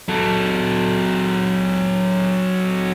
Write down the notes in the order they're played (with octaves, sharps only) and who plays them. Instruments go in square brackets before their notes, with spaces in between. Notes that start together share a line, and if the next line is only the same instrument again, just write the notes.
[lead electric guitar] F#3 A4